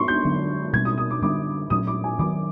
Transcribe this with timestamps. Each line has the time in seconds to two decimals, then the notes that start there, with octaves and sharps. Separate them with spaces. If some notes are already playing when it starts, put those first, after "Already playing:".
Already playing: C6 C#6
0.08 G6
0.25 D3 F#3 B3 D4
0.73 B2 G3 C4 G#6
0.85 D#6
0.98 D#6
1.10 D6
1.22 D3 G3 B3 D4 D6
1.70 A#2 F#3 A3 C#4 D#6
1.87 D6
2.04 G#5
2.19 D#3 F#3 B3 D6